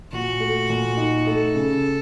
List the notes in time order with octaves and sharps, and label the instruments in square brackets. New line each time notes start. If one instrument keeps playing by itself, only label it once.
[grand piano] A#2 [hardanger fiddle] F#4
[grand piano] A3
A#2
D#4
[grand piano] A3 [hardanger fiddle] A4
[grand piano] C#3